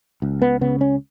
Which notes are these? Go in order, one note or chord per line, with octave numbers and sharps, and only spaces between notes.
C#2
B3
C#3 B3
C#4